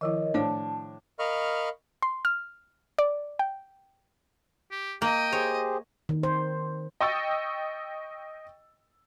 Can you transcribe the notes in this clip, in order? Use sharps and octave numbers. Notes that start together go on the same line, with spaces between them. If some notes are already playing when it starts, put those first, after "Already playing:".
D#3 F3 E4 A#4 C#5 D#5
A2 D4 C5 C#5 F5 A5
A#4 D#5 F5 B5 C#6 F6
C6
F6
D5
G5
G4
A#3 D#5 G5
G4 G#4 C5 C#5
D#3
C5
D#5 G5 C#6 E6 A6